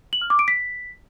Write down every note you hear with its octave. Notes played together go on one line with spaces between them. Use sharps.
F#7
F6
D6
D7
B6